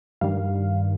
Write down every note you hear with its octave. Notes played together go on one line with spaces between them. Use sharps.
G2 D#3 G3 F5